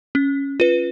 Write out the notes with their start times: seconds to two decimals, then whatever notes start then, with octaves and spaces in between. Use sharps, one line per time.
0.15 C#4
0.60 F4 B4